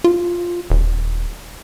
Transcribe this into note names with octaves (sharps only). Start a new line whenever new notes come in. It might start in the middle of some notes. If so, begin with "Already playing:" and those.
F4
D#1